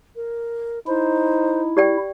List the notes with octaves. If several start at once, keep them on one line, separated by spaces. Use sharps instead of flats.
A#4
D#4 E4 C5
G4 D5 G5